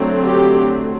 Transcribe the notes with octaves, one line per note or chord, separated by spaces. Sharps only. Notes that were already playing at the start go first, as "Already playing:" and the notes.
Already playing: D3 F#3 A3 C4
G4